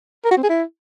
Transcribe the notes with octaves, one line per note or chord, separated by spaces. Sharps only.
A#4
F#4
C4
G#4
E4